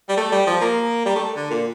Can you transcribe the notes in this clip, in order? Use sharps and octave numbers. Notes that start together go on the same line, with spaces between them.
G3
A3
G3
F3
A#3
G3
A3
D3
A#2